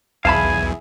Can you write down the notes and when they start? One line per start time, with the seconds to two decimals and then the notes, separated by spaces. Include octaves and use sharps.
0.25 B1 E2 E4 G#4 F5 G#5 A5 B5